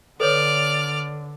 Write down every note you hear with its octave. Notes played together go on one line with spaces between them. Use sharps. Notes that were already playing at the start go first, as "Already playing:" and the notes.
D3 A4 B4 C#5 D5 F6